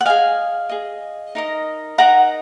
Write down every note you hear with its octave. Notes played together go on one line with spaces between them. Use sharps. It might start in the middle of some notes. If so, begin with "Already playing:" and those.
F#5
G#4 D#5 F5 G#5
G#4 D#5
D#4 A#4 D#5
D#4 A#4 D#5 F#5 A#5